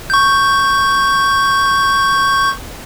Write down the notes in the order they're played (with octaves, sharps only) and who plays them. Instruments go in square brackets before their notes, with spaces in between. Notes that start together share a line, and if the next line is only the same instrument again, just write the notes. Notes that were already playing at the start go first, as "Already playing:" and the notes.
[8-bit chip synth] C#6 G6